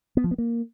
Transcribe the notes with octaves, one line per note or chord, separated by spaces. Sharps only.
B3
F3
B3
A#3